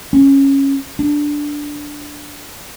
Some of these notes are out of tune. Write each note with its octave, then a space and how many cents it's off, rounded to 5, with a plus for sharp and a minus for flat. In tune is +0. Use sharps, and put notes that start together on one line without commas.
C#4 -10
D4 +0